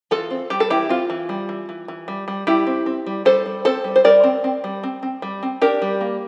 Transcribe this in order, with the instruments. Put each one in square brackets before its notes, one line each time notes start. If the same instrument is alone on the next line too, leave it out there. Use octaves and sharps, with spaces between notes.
[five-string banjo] E3 F4 A4
C4
G3 G4
A4
E3 E4 G4
C4 F4
E3
G3
E3
E3
E3
G3
G3
G3 E4 G4
C4
C4
G3
G3 A4 C5
G3
C4 A4 C5
G3
C5
G3 A#4 D5
C4
C4
G3
C4
C4
G3
C4
D4 G4 A#4
G3
A#3